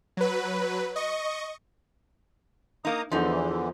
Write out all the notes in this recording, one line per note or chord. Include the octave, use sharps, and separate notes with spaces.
F#3 B4
D#5 C#6
A#3 D#4 A#5 D#6
E2 D3 E3 F3 D#4